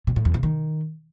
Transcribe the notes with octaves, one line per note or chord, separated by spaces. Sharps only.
B2
A2
E2
C3
D#3